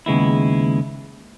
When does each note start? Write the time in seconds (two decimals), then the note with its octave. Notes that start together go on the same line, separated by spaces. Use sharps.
0.06 D#2 C#3 G#3 B3 E4